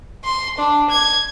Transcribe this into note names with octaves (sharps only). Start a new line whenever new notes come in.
C6
D4
G#6